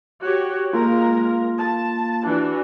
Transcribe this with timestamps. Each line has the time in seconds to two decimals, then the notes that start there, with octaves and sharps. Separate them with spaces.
0.24 F#4 G4 C#5
0.73 G#3 A#3 F4 A#4
1.58 A5
2.27 E3 D4 F#4